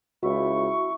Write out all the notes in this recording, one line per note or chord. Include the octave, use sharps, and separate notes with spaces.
C#2 E4 F#4 C#6